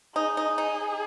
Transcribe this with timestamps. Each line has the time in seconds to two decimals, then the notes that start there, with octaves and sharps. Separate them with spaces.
0.15 D#4 G#4
0.37 D#4
0.58 D#4